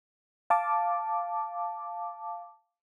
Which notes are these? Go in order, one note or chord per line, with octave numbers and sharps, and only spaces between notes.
F5 A5 D6